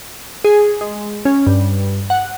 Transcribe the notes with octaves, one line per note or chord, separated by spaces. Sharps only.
G#4
G#3
C#4
G2
F#5